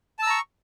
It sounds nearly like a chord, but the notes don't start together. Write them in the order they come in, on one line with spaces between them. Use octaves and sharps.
A5 E6 A#5 C#6